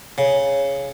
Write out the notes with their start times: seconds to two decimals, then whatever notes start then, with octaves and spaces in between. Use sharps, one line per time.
0.18 C#3